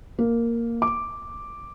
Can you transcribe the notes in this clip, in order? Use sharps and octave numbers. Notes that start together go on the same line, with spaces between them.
A#3
D6